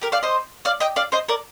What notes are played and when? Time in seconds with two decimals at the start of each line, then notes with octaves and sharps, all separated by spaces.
0.02 G4 A#4
0.12 D5 F5
0.23 C5 D#5
0.65 D5 F5
0.80 D#5 G5
0.96 D5 F5
1.12 C5 D#5
1.29 A#4 D5